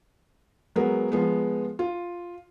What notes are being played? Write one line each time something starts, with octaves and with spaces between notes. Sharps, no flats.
F#3 G#3 B3 A#4
F3 G#3 B3
F4